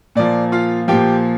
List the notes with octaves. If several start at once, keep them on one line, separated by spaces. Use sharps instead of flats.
A#2 F3 D5
F4 F5
A#2 F3 G4 G5